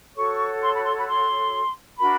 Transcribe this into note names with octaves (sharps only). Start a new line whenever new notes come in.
F#4 A4 C#5 C#6
C6
B5
C6
B5
C6
D4 F#4 A#4 B5